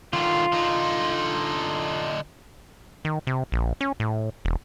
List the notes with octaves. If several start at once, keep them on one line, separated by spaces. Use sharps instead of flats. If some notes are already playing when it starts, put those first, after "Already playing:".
D3 D#3 F4
D3 D#4
D#3
C3
A#1
C#4
A2
E1